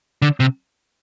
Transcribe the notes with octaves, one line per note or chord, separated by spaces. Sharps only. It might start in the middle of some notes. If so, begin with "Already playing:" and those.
D3
C3